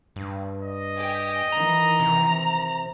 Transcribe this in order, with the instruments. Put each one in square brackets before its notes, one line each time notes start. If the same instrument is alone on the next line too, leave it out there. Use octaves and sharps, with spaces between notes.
[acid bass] G2
[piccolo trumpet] D#5
[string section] G4 G#5
[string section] D#3 E3 [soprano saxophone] A#5
[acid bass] C3